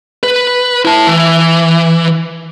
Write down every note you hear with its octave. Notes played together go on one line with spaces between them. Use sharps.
B4
E4 A5
E3